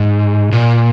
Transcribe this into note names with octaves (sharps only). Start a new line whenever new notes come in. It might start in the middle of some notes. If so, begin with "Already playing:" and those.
Already playing: G#2
A#2